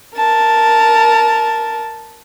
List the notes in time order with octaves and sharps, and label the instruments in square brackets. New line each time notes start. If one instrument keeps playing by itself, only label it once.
[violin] A#4 A5